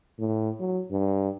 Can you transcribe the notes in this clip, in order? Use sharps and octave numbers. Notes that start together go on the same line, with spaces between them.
A2
F#3
G2